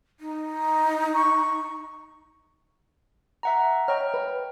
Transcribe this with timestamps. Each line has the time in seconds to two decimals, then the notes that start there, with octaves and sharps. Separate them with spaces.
0.20 D#4
1.14 C#6
3.43 E5 F#5 A#5
3.88 C#5 D#5 G5 A#5 F6
4.14 B4